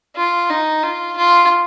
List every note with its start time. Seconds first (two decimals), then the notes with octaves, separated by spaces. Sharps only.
0.16 F4
0.50 D#4
0.83 F4
1.17 F4